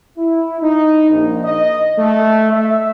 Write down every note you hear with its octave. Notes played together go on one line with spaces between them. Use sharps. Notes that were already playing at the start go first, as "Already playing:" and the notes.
E4
D#4
A#1
D#5
A3
E5